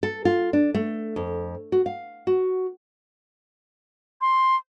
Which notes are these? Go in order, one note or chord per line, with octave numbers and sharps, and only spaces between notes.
A4
F4
D4
A3
F2
F#4
F5
F#4
C6